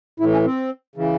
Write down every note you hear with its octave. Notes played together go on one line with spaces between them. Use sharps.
A2 E3 E4
C#4
C4
C#3 E3